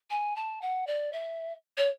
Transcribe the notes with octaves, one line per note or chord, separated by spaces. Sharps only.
G#5
A5
F#5
D5
E5
C#5